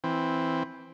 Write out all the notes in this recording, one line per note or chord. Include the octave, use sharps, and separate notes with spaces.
E3 C4